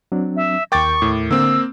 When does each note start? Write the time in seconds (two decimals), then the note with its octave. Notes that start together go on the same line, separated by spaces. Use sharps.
0.12 F#3 C4 D4
0.36 E5
0.72 D#2 A#4 G5 C#6 D6 A6
1.02 A2
1.31 D3 A#3 C4 E6